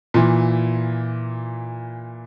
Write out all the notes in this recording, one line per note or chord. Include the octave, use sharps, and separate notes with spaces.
A#2 E3